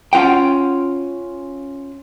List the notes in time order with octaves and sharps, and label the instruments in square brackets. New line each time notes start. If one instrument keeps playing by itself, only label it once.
[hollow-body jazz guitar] C#4 F4 F#5 G5